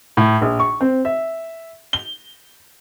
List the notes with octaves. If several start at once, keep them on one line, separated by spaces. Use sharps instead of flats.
A2
A#1
C#6
C4
E5
G7